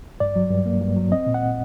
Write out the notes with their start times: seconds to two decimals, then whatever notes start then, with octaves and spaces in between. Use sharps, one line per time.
0.20 G2 D5
0.36 F#3
0.50 G2
0.66 A#3
0.81 G2
0.97 F#3
1.12 C4 D#5
1.27 A#2
1.34 F#5